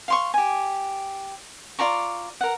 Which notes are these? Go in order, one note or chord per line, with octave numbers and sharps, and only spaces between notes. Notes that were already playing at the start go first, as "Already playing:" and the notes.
F5 C6 C#6
G4 G#5
F4 D5 A#5 C#6
A#4 F#5